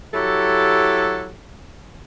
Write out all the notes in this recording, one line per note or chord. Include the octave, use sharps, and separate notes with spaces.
F#3 E4 G4 A4